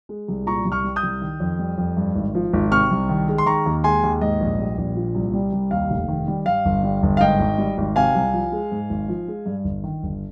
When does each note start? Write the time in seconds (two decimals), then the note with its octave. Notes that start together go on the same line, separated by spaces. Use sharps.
0.09 G#3
0.28 C2
0.46 A#2 A#5 C#6
0.65 C2
0.72 C#6 F6
0.84 G3
0.96 D#6 G6
1.03 C2
1.22 D#3
1.40 F2
1.59 G3
1.78 F2
1.97 G2
2.15 G#1
2.35 F3
2.53 G#1
2.71 C3 C#6 F6
2.91 C2
3.09 D#3
3.28 G#3
3.38 C6
3.46 D#3 A#5 C#6
3.66 D#2
3.84 G#3 G#5 C6
4.03 D#2
4.21 G#2 D#5
4.41 A#1
4.59 G3
4.78 A#1
4.96 A#2
5.15 C2
5.33 G3
5.53 C2
5.71 D#2 F5
5.91 F1
6.08 D#3
6.28 G3
6.46 G2 F5
6.65 G1
6.83 G3
7.03 G1
7.17 F5
7.21 G#2 D#5 G5
7.40 G#1
7.58 G3
7.78 G#1
7.96 C3 F5 G#5
8.15 C2
8.34 F3
8.52 G#3
8.72 G#2
8.90 G#1
9.09 F3
9.28 G#3
9.46 G2
9.65 G1
9.84 D#3
10.03 G1